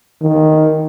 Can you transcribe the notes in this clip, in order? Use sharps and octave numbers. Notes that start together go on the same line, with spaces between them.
D#3